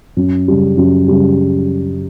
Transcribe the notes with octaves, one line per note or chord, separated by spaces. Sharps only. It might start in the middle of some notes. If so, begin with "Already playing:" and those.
F#2
C#3 G3
F#2
C#3 G3